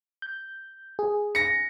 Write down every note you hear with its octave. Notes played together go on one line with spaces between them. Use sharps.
G6
G#4
A#6 C#7